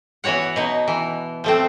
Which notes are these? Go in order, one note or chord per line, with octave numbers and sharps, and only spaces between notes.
E3 B3 F#4 C#5 F#5
B2 D#4
E3
F3 A3 C4